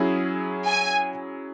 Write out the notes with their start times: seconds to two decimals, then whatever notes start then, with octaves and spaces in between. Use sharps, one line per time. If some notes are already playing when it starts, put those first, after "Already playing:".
Already playing: F#3 C#4 E4 G#4
0.66 G#5